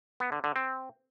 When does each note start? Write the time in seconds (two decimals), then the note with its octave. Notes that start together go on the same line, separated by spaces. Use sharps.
0.20 B3
0.32 D3
0.44 D3
0.56 C4